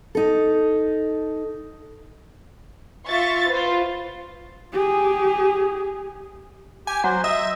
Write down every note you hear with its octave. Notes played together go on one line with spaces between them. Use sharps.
D#4 A4
F4 E5 C#6 A6
F4 B4 C5
G4 G#4
G4 G#5
F#3 C5
D#5 E5